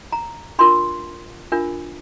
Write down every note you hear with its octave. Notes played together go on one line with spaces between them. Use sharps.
A#5
D4 F4 A#4 C6
D4 F4 A#4